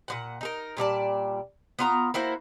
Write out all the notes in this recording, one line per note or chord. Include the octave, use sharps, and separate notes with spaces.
A#2 B3 F#5
D#4 A4 A#4
A#2 G3 D5 A5
B3 F4 A#5
A#3 E4 F#4 C5